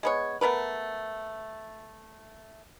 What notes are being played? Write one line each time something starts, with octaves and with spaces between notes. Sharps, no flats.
G#3 B3 C#5
A3 B3 A#4 B4